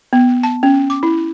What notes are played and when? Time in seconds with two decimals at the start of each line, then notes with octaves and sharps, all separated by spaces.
0.13 B3
0.43 A5
0.63 C#4
0.90 D6
1.03 E4